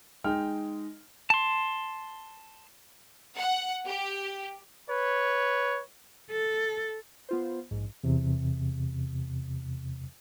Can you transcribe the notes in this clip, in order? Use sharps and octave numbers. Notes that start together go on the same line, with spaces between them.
G#3 D#4 G5 F6
A5 C6
F#5
G4
B4 C#5
A4
B3 F4 C5
A#1 G#2
E2 C3